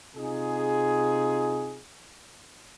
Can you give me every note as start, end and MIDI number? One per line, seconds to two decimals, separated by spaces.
0.15 1.79 48
0.15 1.79 63
0.15 1.79 65
0.15 1.79 68